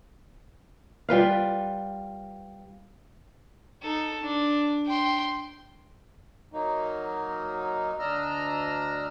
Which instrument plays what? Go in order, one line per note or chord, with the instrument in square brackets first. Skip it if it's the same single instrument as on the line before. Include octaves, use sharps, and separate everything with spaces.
[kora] G3 F4 B4 F5
[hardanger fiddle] D#4 A4
D4
G5 C6
[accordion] F#3 A#3 D#4
D2 D4 D#5 A#5 E6 F6